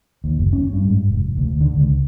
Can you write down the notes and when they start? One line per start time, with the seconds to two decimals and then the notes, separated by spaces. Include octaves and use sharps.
0.24 D#2
0.38 F#1
0.53 C#4
0.73 G2
0.85 G#2
1.10 F1
1.37 D2
1.61 D3
1.76 C#2